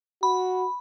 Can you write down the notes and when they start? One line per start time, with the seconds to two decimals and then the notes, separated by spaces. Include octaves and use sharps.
0.23 F#4 B5